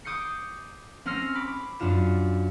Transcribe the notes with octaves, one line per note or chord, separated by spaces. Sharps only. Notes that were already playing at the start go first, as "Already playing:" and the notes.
D6 D#6 G6 C7 C#7
C4 C#4 E6 F6 A#6 C7
B5 D6
F#2 D4 F4 E7